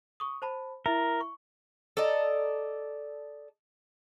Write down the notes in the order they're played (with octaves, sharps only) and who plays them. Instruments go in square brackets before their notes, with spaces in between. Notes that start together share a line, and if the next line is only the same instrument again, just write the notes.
[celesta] C#6 D#6
C5 A5 B5
[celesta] E4 E5 [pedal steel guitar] A#4
[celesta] C#6
[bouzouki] A4 D5 D#5 A#5